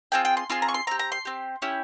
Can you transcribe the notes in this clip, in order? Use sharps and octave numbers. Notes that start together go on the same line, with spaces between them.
C4 F4 G#4 G5
G5
C6
C4 F4 G#4 C6
A#5
C#6
C6
C4 G4 A#5
A#5
C6
C4 G4
C#4 E4 G4